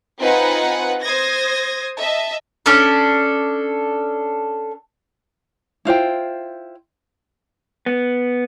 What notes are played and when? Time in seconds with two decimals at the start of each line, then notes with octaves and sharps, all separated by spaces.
0.21 C4 D#4 F4 B4 F#5 G#5
1.01 C5 D#6 G#6 A#6
1.99 D#5 E5 A5
2.66 C#4 D4 A4
5.85 E4 F4 C5 G5
7.86 B3